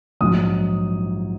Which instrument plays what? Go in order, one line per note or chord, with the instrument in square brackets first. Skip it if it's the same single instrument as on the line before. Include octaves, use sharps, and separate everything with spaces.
[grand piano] A#1 G#2 F#3 D#6